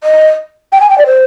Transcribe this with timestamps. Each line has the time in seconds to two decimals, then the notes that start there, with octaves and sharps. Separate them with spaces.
0.04 D#5
0.72 G5
0.81 G#5
0.90 G5
0.98 D5
1.06 C5